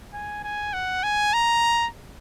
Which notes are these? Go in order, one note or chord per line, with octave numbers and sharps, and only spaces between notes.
G#5
G#5
F#5
G#5
A#5